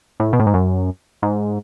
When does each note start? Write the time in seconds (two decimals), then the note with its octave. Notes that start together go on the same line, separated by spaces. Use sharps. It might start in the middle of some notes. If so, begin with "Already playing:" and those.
0.20 A2
0.33 B2
0.40 A2
0.47 G#2
0.54 F#2
1.22 G#2